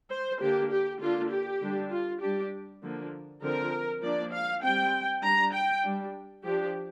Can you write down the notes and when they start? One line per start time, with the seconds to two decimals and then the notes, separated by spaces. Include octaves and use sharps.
0.11 C5
0.40 D3 A#3 D4 G4
0.71 G4
1.00 D3 A#3 D4 F4
1.30 G4
1.61 D3 G3 D4
1.91 F4
2.21 G3 D4 G4
2.82 D3 F3 A#3
3.42 D3 F3 C4 A#4
4.01 F3 A#3 D4 D5
4.32 F5
4.62 G3 C4 G5
5.22 G3 D4 A#5
5.53 G5
5.82 G3 D4
6.43 F3 D4 G4